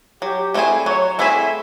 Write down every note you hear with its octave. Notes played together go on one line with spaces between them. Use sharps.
F#3 G4
A3 C4 E4 G#4
F#3 C#5
A3 C4 E4 G#4 E5